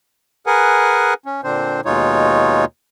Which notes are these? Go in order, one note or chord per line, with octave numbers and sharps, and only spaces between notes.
G#4 A#4 B4 F#5 G#5
C#4
A#2 D3 C4 D4 C5
D#2 B2 G#3 D#4 F4 C#5